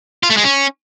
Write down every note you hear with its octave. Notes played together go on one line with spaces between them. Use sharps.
F4
A3
G#3
C#4